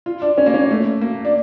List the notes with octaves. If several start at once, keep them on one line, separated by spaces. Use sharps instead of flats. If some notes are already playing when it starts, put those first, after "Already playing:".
F4
D4
C#4
A#3
C#4
A3
A#3
D4